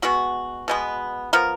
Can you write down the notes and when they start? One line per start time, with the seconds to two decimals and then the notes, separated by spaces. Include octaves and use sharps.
0.02 B2 G#3 B3 F#4
0.68 B2 G#3 B3
1.33 F3 B3 A#4